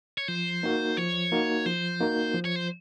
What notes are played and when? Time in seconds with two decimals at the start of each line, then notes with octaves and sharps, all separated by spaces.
0.18 C#5
0.28 F3 C5
0.63 A#3 D#4 F#4 A#4
0.97 F3 C#5
1.32 A#3 D#4 F#4 A#4
1.66 F3 C5
2.00 A#3 D#4 F#4 A#4
2.34 F3
2.45 C#5
2.56 C5